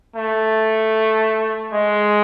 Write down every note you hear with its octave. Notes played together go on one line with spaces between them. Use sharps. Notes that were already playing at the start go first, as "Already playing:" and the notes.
A3
G#3